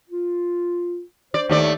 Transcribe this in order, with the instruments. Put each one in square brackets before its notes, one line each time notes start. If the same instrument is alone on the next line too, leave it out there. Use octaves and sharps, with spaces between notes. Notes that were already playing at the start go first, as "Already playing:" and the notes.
[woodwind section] F4
[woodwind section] C5 [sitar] D5
[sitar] D#2 A3 D5